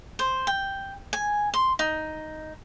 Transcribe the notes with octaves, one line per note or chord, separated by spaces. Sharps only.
C5
G5
G#5
C6
D#4